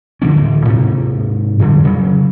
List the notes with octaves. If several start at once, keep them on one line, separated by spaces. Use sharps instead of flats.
G2 D3 E3 C#4
D1
G#2 C3
F2 D3 G3
C#3 F#3